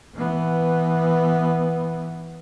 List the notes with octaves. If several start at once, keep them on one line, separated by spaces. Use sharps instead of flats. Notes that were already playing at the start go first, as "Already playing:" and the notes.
E3 B3